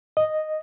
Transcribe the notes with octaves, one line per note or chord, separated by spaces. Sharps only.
D#5